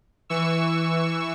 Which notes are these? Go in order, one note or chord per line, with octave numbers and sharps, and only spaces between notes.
E3 C#6 E6